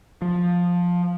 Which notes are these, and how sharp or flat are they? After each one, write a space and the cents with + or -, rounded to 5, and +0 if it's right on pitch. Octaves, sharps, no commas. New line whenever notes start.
F3 +10